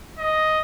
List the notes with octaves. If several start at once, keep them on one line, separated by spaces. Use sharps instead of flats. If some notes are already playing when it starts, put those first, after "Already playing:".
D#5